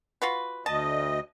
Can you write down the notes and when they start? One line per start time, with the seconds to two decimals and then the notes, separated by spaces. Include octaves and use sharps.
0.22 F4 F#4 B4
0.66 D2 D#5 A5